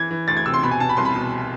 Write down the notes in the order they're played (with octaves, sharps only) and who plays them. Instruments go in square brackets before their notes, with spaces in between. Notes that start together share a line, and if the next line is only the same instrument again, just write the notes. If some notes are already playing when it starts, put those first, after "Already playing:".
Already playing: [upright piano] E3 G#6
E3
D2 A6
G#6
C3 E6
C6
B2 B5
G#5
B2 A5
B5
C2 C6
B5
B2